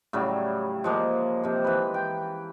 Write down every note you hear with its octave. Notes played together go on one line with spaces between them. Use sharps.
A2 C#3 F#3 G3
F3 G#3 A#3
C3 F3
E3 B4
G5